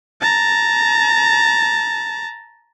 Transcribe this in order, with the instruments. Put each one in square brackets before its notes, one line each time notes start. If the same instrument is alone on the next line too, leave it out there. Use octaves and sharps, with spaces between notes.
[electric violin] A5 A#5